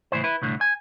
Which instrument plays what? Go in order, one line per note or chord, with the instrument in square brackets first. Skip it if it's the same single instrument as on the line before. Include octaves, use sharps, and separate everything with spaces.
[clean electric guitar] C#2 A2 C#3 E3 C5
E4 B4
C2 A2 D3
G#5